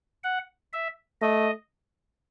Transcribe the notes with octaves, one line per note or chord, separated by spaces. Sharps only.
F#5
E5
A3 D#5